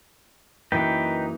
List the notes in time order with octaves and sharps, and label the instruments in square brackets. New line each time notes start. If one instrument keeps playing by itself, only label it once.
[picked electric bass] F#2 A#2 E3 [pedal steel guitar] D#4 B4 G5